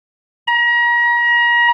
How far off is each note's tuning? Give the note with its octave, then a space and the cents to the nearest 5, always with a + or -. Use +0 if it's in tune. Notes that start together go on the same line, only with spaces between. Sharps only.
A#5 +35